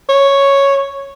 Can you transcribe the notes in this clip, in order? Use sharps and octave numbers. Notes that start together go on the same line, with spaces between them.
C#5